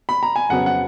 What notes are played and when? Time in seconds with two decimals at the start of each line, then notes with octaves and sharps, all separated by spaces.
0.09 B5
0.23 A#5
0.36 G#5
0.50 F2 C#3 F#3 B3 F#5
0.66 F#5